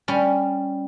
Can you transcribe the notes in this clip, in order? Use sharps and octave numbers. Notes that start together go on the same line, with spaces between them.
G3 C#4